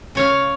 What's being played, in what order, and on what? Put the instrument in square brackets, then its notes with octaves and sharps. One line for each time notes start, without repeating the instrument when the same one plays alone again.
[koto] C#3 C#5 F5